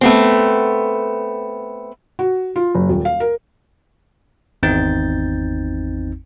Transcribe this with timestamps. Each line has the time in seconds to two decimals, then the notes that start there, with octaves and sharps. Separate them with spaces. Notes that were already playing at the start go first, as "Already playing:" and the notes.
0.01 A3 B3 C4
2.19 F#4
2.56 F4
2.75 F#1
2.89 D#1
3.05 F5
3.20 A#4
4.63 G#1 E2 C4 D#4 G6 A6